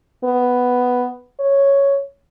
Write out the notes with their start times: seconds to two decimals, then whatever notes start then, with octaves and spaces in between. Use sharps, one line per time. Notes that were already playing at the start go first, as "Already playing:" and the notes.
0.24 B3
1.40 C#5